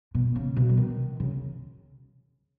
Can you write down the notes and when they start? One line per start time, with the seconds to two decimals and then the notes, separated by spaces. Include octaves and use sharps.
0.15 B2
0.36 C#3
0.56 B2
0.69 F#3
0.78 D#3
1.20 C#3